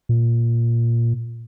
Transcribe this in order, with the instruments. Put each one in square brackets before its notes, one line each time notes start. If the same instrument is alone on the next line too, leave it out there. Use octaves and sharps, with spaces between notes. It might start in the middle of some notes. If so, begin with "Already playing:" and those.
[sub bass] A#2